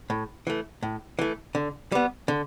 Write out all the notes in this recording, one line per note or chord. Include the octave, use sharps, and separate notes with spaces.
A2
E3 A3
A2
E3 A3
D3
G3 B3
D3